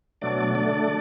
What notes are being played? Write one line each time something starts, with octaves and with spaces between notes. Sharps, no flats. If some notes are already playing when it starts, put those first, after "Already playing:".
B2 F#3 A3 D4 D5
D3 A3 D4 D5